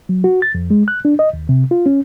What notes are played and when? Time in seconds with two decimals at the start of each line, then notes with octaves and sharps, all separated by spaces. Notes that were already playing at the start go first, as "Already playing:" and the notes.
0.09 F#3
0.24 F#4
0.42 A6
0.55 F2
0.71 G#3
0.88 F#6
1.05 D4
1.19 D#5
1.33 D#2
1.49 C3
1.71 F4
1.86 C#4